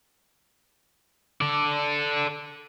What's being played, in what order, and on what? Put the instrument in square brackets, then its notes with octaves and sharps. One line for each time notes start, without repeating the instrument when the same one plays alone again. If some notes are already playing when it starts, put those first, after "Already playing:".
[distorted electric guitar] A4 D5